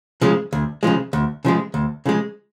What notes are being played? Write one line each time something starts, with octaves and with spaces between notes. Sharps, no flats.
C#3 F3 G#3
D2
C#3 F3 G#3
D2
C#3 F3 G#3
D2
C#3 F3 G#3